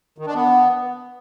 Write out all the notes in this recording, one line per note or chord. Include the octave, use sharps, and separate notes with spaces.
D#3
D4
B3